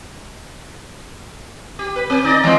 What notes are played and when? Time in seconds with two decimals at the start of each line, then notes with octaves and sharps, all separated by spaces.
1.79 G4
1.96 B4
2.10 C4
2.24 D#4 D5 D#5
2.43 E3 G#3 C4